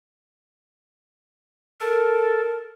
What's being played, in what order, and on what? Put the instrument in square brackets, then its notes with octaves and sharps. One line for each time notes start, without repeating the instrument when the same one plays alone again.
[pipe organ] A4 [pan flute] A#4